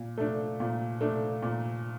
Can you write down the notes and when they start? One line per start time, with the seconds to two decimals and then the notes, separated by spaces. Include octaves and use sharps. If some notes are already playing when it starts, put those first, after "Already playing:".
Already playing: A#2
0.18 A3 D4
0.60 A#2
1.01 A3 D4
1.43 A#2